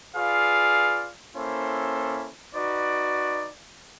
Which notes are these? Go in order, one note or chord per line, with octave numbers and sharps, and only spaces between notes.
F4 G#4 B4 D5 F5
A#3 C#4 E4 A4 C5
D#4 F#4 B4 D5